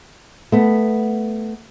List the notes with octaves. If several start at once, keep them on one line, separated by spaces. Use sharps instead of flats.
A3 B3